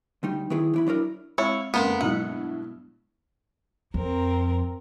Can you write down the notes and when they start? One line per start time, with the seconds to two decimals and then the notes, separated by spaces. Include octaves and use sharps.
0.23 D2 G3 D#4
0.50 D#3 B3 E4 G#4
0.74 E3 E4 B5
0.87 F#3 D4 E4 A#4
1.38 G#3 C4 E4 C#5 F5
1.74 F#1 F2 G#3 A#3 B3 A#4 C6
2.01 G2 B2 F#3 G#3 E4 F#4 F#5
3.94 F2 C4 A#4